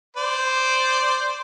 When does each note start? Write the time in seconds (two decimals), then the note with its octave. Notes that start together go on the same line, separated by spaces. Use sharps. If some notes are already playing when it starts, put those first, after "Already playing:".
0.17 C5 D5